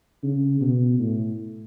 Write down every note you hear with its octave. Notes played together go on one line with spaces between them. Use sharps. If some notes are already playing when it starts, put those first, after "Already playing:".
C#3
B2
A2